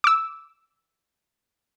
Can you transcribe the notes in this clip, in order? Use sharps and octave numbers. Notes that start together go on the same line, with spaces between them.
D6 E6